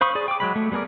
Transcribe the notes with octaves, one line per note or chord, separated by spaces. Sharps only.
C5 F5 B5 C#6 D#6
G#4 D5
G5 D6
F#3 G#3 B5
A3
G3 B3 G#4 A#4 D5